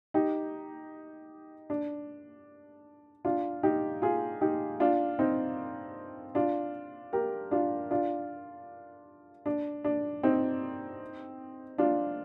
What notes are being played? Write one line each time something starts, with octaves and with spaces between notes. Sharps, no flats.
D#4 G4
D4
D4 F4
D#4 G4
F4 G#4
D#4 G4
D4 F4
C4 D#4
D4 F4
G4 A#4
D4 F4
D4 F4
D4
D4
C4 D#4
D4 F4